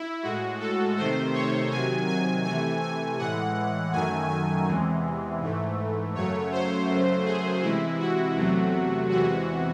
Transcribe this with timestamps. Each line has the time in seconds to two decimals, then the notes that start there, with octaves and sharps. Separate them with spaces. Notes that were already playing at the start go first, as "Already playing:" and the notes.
Already playing: E4
0.23 A2 G#3 F#4
0.60 A4
0.97 C3 D#3 A3 C5
1.34 C#5
1.71 C3 D#3 F#3 G#5
2.07 G#5
2.44 C3 E3 A3 G#5
2.82 G#5
3.18 A2 E3 G#3 F#5
3.93 F#2 D#3 F#3 A3 G#5
4.30 G#5
4.67 E2 C3 E3 G#3
5.41 G#2 E3 A3
6.14 F#2 C#3 F#3 A3 C#5
6.52 C5
6.88 F#2 C#3 F#3 A3
7.25 G#4
7.62 C3 E3 G#3 E4
7.99 F#4
8.36 E2 C3 F#3 A3
9.10 E2 C3 E3 G#3 F#4